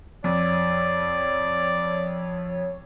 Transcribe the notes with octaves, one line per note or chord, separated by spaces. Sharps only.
F2 C#5 D5